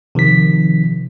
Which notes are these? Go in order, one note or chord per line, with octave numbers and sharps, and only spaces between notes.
C3 D#3 F3 B6